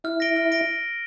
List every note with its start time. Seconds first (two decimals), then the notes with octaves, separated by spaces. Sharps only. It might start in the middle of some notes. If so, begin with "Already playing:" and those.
0.04 E4 F6
0.20 A#6 D7 G7
0.36 F6
0.52 A#6 D7 G7